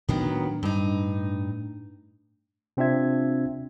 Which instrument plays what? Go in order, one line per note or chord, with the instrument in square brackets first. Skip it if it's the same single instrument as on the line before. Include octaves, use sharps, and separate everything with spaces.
[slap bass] A2 D4 [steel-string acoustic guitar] D#3 F#3 B3
[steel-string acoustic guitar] G2 D#4
[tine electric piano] C3 C4 D4 F4 E5 G#6